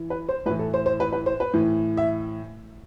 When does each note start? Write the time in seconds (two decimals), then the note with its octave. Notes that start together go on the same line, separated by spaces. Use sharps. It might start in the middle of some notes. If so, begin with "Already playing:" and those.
Already playing: E3
0.10 B4
0.29 C5
0.46 A2 B4
0.51 E3
0.59 A4
0.74 C5
0.86 C5
1.00 B4
1.13 B4
1.26 C5
1.40 B4
1.54 A2 E3
1.97 E5